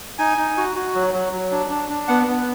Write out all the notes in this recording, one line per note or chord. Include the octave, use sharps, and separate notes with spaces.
D#4 G#5
D#4
F#4
F#4
F#3
F#3
F#3
D4
D4
D4
B3 F#5
B3